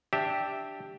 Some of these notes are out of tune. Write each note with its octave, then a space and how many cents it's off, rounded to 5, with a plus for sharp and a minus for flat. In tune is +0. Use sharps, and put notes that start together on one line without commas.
D4 +0 G4 +0 E5 -10